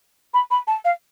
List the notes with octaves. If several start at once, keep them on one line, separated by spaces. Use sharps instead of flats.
B5
B5
A5
F5